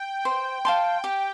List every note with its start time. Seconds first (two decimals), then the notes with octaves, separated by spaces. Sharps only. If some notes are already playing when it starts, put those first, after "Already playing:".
Already playing: G5
0.25 C5
0.65 F5 A5 C6
1.04 G4